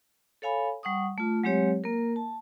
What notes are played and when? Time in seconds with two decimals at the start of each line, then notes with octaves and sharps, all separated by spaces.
0.42 A4 C#5 F5 G#5 B5
0.83 G3 F#5 C#6 D#6
1.18 A3 F4
1.44 F#3 G#3 C4 G4 C#5
1.84 A#3 A#4
2.16 A5